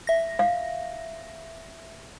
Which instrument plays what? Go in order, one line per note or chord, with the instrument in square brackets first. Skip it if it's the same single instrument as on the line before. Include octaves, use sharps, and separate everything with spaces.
[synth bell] E5 A#6
[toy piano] F5